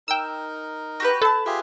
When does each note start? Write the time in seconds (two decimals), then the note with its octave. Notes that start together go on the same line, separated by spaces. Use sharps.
0.08 D#4 A#4 G5 E6
1.00 F#4 G4 B4
1.22 E4 A4 B4 A5
1.46 F4 G4 G#4 E5